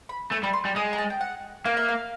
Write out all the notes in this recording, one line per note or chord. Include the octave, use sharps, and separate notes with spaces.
B5
A3 G#5
G3 B5
C6
G3
G#3 D#6
A#5
A5
G5
F#5
A#3 F5
E5
F5